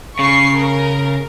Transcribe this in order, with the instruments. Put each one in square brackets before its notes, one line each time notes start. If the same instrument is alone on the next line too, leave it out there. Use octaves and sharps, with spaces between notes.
[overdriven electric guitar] C#3 [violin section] C#6 C7
[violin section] A#4